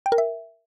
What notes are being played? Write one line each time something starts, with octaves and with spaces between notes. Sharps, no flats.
G5
A#4
E5